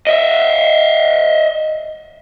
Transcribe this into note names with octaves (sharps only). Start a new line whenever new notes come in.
D#5 E5